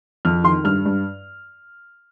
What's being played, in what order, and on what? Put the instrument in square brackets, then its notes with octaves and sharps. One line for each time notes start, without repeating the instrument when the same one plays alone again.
[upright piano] F2 F6
D#3 C6
G2 F6
G2